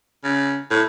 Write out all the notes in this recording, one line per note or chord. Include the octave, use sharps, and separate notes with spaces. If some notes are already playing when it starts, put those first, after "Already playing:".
C#3
A2